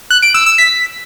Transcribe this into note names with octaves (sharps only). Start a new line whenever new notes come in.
F#6
D7
E6
E6
B6